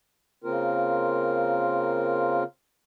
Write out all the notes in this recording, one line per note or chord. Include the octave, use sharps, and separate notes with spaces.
C#3 A#3 C4 F4 A#4